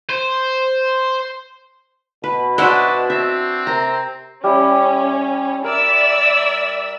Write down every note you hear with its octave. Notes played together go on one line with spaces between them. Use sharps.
C5
B2 B4
D4 E4 F#4 B4 C5 D5 D#5
C4 E5
C3 A#4 A#5
G3 C#4 E4
A#4 D5 E5 E6